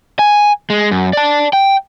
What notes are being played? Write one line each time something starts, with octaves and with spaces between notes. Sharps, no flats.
G#5
G#3
F#2
D5 A5
G5